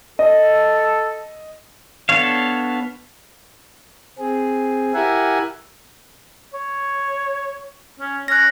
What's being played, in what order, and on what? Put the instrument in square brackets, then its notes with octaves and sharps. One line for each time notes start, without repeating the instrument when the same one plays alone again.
[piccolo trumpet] A4 [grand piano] D#5
[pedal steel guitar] B3 D4 A4 C#5 F5
[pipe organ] C4 G#4
E4 G4 A#4 E5 F#5 G#5
[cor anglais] C#5
C#4
[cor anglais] C#4 [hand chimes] F#6 A#6